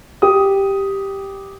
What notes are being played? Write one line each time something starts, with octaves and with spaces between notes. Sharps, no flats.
G4 D#6